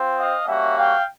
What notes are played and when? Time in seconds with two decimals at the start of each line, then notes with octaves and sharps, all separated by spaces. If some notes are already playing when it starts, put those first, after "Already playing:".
Already playing: C4 F4
0.17 D#5 F5
0.47 G3 A#3 C#4 F#4 E5 F#5
0.77 F5 G5